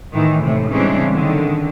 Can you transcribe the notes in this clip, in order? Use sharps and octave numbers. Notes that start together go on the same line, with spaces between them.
A2 D#3 E3
A2 C3
C#3 E3 G3 G#3 C4 D4
D3 D#3